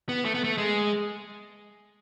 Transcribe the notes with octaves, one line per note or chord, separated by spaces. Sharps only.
B3
A3
B3
A3
G#3